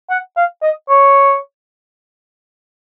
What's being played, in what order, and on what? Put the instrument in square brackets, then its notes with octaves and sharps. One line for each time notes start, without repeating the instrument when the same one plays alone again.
[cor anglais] F#5
F5
D#5
C#5